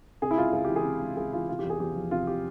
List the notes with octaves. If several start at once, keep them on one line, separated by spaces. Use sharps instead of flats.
C3 G#4
E4
C#2 F4
C#2 G#4
E3 G4
G#4
C3
C#2
C#2 G#4
E3 F4
C3 F4
G4
E2
G#4
E2 G4
F3
C3 F4
G4